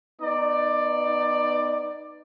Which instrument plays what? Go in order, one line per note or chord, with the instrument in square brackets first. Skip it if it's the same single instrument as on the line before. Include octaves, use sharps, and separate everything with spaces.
[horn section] B3 D#4 D5